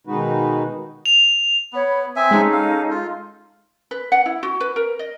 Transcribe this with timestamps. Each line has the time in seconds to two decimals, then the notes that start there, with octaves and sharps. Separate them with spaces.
0.07 B2 D#3 G#3 D#4 F#4 B4
1.06 F7
1.73 B3 C#5 B5
2.16 C4 E5 G#5 D#6
2.31 G#3 C#4 D#4 A4
2.53 F5
2.90 F4
3.91 B4
4.12 F#5
4.26 E4
4.43 F#4
4.60 B4
4.76 A#4
4.99 D#5